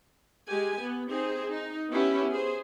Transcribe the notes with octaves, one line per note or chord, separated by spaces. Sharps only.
G#3 G4 G#5
B3
C4 D#4 G#4 C5
D#4
B3 C#4 E4 G4
G#4 C5